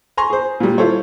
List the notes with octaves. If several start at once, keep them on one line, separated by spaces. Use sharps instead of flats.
G#5 A#5 C6 C#6
G#4 C5
A#2 G3
E4 F4 A4 C5 C#5